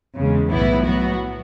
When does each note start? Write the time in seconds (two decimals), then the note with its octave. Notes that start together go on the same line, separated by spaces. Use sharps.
0.16 E2 C#3 G#3
0.50 B1 A2 E3 B3 E4
0.85 A2 F#3 B3 F#4